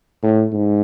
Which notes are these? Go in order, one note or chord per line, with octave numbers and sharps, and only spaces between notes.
A2
G#2